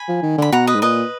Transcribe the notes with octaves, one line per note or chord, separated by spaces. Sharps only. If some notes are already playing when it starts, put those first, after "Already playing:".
Already playing: G#5 B5
F3
D#3
D3 B5
B2 F#5 A#5
B4 D#5
G#2
A#2 B4 D#5